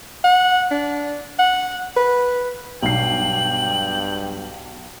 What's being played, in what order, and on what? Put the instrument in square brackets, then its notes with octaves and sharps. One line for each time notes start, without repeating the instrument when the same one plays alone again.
[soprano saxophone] F#5
D4
F#5
B4
[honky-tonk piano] B1 C7 [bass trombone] G2 [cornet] G5 [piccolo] F#7